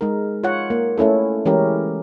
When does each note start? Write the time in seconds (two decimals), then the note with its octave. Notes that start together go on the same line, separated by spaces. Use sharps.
0.01 G#3 D#4 A#4
0.44 F4 C#5 F#5
0.70 A#3
0.98 A3 C#4 E4 A4
1.45 E3 G#3 C#4 E4 G4 A#4